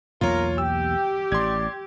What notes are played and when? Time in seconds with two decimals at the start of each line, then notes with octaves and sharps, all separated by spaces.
0.21 B1 E2 A#3 F4 A#4 C#5
0.58 G4 G5 E6
1.32 A1 D5 C6 G#6